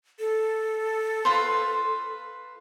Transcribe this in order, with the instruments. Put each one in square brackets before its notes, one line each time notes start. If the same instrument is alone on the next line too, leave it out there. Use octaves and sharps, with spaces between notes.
[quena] A4
[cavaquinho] F4 B4 C5